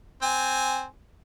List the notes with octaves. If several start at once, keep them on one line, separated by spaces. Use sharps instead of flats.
C4 G#5